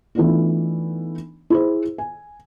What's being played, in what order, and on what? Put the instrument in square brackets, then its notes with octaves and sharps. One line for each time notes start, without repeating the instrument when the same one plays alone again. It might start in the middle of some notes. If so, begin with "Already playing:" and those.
[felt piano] E3 A3 B3 D4 D#4 F4
E4 G#4 C5
G#5